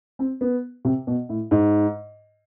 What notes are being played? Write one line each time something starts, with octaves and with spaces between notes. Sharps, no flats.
C4
B3
C3
B2
A2
G#2